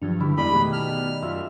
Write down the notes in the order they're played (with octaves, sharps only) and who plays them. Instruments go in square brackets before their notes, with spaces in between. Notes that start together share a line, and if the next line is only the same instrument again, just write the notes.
[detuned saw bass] G2 [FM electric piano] F3 F#3 D4
[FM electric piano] D3 [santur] E4 G4
[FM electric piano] F2 B3 E4 [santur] G3 D#4 [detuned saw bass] G#3 [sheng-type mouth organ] B5
[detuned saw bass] B2 [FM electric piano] D#3 A3 G#4
[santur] A5 [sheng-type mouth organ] F6
[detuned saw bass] F#2 [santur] F4 E5